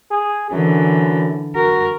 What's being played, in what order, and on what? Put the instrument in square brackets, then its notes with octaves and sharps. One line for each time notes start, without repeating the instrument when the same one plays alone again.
[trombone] G#4
[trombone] F#2 [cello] D3 E3
[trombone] F#4 [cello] A#4